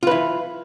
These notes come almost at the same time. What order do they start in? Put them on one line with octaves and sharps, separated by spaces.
F4 B4 E4